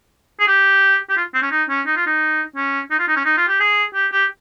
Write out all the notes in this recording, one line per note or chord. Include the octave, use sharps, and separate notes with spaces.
G#4
G4
G4
F4
C4
C#4
D#4
C#4
D#4
F4
D#4
C#4
D#4
F4
D#4
C#4
D#4
F4
G4
G#4
G4
G4